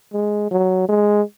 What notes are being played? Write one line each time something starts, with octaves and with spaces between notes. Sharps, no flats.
G#3
F#3
G#3